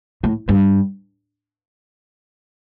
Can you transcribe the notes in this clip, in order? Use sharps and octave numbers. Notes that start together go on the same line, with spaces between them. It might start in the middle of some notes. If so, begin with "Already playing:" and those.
A2
G2